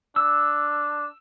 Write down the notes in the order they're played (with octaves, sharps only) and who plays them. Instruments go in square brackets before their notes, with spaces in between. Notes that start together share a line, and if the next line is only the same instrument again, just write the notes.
[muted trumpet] D4 [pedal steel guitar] E6